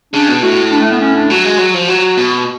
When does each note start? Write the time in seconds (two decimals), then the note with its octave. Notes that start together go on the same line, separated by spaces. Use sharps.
0.13 C#3 D4
0.29 B2
0.43 A2 F#4
0.72 D4
0.81 A3
0.91 B3
1.01 C#4
1.16 D4
1.30 F#3 F#4
1.45 G#3
1.59 F#3
1.74 F3
1.88 F#3 F#4
2.17 B2